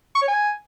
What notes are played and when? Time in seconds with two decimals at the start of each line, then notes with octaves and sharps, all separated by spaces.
0.15 C#6
0.22 C#5
0.28 G#5